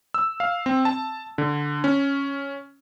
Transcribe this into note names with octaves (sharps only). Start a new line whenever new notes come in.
E6
F5
C4
A5
D3
C#4